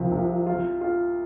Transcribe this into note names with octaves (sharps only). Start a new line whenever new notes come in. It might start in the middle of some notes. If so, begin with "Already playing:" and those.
Already playing: C2 C3 F3
C2
F4
F4